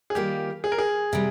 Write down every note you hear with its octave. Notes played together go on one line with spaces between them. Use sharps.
G#4
D#3 G3 A#3 F4 G4
G#4
A#4
G#4
C3 G3